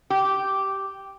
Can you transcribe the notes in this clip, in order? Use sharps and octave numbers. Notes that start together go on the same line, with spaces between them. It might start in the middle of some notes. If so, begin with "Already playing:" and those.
G4